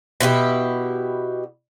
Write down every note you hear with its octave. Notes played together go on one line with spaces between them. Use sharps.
B2 E4 F4 G4